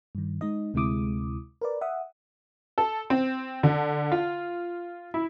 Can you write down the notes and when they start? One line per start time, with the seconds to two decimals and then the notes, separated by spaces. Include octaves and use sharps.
0.15 G2 D#3
0.41 G#3 D#4 D#5
0.74 D2 C3 G#3 E4 D6 D#6
1.61 A#4 B4 D5
1.81 E5 F#5 D#6
2.78 A4
3.10 C4
3.63 D3
4.12 F4
5.14 E4